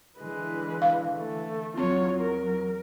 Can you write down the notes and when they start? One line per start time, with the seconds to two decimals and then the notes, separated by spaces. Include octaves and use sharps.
0.19 D3 E3 G#3 B4
0.82 F5
1.18 A3
1.77 E2 F#3 C4 F4 C#5
2.21 A#4